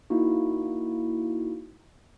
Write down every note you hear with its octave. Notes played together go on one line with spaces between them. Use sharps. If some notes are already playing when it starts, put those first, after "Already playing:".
A#3 D#4 E4 F#4